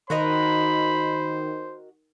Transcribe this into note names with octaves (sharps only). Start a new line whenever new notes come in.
D#3 F#4 A#4 C5 D#5 B5